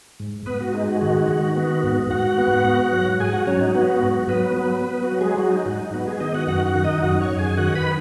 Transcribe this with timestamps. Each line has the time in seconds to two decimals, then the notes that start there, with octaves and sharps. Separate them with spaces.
0.20 G#2
0.46 G#2 B3 B4
0.60 F#4
0.74 G#3 D#4
0.88 F#4
1.01 D#3 F#4
1.29 D#3
1.55 B3
1.84 G#2
2.10 G#2 F#4 F#5
2.38 B3
2.65 G#2
2.92 F#3
3.20 G#2 G#4 G#5
3.33 F#4 F#5
3.47 F#3 C#4 C#5
3.61 D#4
3.74 B3 F#4
4.02 G#2
4.29 F#3 B3 B4
4.56 F#3 B3 B4
4.83 B3 B4
5.03 F#4
5.12 F#3
5.21 G#3 G#4
5.39 F#3 F#4
5.52 D#4
5.66 G#2 F#4
5.79 D#4
5.93 B3 F#4
6.07 G#3 G#4
6.20 D#3 D#4 D#5
6.34 F#4 F#5
6.47 F#2 F#4 F#5
6.66 F#4 F#5
6.75 D#3
6.84 D#4 D#5
7.02 F#2 F#4 F#5
7.20 C#5 C#6
7.30 F#2
7.39 G#4 G#5
7.57 D#3 F#4 F#5
7.75 B4 B5